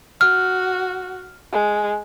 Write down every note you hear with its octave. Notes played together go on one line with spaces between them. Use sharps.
F#4 F6
G#3